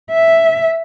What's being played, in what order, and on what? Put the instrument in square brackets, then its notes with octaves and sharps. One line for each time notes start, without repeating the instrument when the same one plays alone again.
[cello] E5